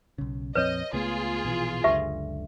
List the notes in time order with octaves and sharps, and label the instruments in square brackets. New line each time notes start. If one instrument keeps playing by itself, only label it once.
[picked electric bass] B1 C#3
[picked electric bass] A#1 F2 C4 [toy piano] B4 C#5 [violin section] D#5
[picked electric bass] C#2 A3 B3 [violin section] F4 G#4
[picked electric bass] A#1 B2 E3
[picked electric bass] F#1 C#2 D3 [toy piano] G4 B4 E5